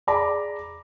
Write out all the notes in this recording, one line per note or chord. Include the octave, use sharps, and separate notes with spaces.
G#4 D5 A#5 B5 D6